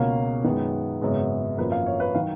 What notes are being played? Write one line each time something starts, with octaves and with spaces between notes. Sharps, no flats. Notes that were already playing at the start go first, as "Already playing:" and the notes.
Already playing: C#2 B2 A#3 C#4 F5
F#2 D#3 G#3 B3
G#1 F#2 C#3 G#3 B3
G#1 F#2 F3 A#3 B4
F5
C#5
B4
D#3 F#3 F5